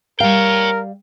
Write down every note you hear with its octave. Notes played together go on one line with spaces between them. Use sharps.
G3 A#4 C#5 F5 G5